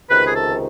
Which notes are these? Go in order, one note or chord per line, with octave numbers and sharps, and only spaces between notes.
C#2 C3 D#3 B4
G#4
A4